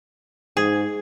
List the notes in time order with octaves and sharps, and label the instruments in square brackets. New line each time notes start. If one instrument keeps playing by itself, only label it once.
[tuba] G#2 [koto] G#4